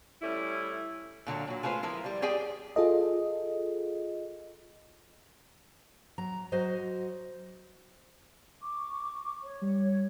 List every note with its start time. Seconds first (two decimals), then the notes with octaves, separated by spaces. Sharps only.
0.22 G3 A3 C#4 E4
1.26 A#2 D3 F#3 A#3
1.47 A#2 F#3
1.63 G#3 A3 F4 B4 C5
1.83 F3 E4 A#4
2.04 G3 C5
2.22 G4 G#4 D5 G5 G#5
2.76 F4 G#4 A4 D#5
6.18 F#3 A#5
6.52 F#3 F#4 C5 D#5
8.62 C#6 D6
9.42 C#5
9.62 G3